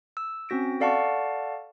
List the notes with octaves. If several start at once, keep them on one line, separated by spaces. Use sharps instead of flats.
E6
C4 C#4 F#4 A#6 D7
A4 D5 F5 F#5 A5 C#6